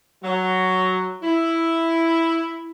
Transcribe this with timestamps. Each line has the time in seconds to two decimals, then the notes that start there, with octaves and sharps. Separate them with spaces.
0.23 F#3
1.22 E4